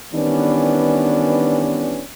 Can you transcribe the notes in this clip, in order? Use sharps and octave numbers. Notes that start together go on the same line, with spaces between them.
D#3 E3 G3 B3 C#4 D4